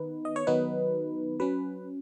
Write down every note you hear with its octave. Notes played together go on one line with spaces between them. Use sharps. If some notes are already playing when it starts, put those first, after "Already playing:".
Already playing: D#3 B3 D#4 B4
D#5
C#5
D#3 F#3 B3 D#4 B4
F#3 C#4 B4